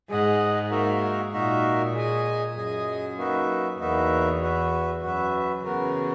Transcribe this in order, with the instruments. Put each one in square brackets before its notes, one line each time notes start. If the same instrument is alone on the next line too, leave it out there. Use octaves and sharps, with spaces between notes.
[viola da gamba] G#2 [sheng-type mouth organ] G#4 D#5 F#5
[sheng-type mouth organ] A#3 D#4 F#4 A#4 E5
[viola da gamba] A#2 [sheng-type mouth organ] A#3 D#4 F#4 A#4 E5
[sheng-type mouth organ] G#4 D#5 G#5
[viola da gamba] F#2 [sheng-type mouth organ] G#4 D#5 G#5
[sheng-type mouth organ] A#3 D#4 F#4 B4 E5
[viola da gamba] E2 [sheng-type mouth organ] A#3 D#4 F#4 B4 E5
[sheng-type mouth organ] F#4 B4 E5
[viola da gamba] F#2 [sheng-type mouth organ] F#4 B4 E5
[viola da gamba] C#3 E3 [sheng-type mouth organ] B3 F#4 A#4